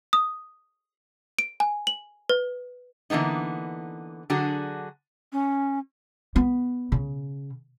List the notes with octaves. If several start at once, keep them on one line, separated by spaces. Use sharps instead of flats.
D#6
D7
G#5
F#7
B4
D3 E3 A#3 B3 D#4
D3 F#3 D4 F#4 G#4
C#4
B3
C#3